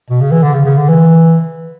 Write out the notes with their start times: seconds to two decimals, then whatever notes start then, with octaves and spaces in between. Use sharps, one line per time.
0.10 B2
0.21 C#3
0.31 E3
0.43 D3
0.54 C#3
0.65 C#3
0.77 D3
0.88 E3